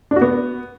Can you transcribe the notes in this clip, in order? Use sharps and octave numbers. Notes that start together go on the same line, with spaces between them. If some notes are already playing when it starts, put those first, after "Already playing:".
D4
F#4
B3